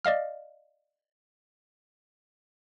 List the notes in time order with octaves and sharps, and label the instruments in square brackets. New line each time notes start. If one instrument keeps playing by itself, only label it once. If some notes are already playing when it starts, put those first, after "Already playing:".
[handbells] D5 D#5 F5 F6